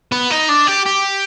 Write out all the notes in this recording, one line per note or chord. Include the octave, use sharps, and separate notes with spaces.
B3
D#4
D4
G4
G4